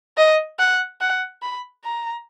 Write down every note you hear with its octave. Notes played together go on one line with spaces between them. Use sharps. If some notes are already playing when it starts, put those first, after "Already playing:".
D#5
F#5
F#5
B5
A#5